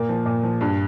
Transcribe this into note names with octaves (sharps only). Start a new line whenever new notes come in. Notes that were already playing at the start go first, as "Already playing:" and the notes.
Already playing: A#2 A#3
F3
A#2
F3
G2